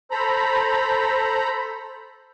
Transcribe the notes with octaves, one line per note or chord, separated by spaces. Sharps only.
A4 C5 A#5 B5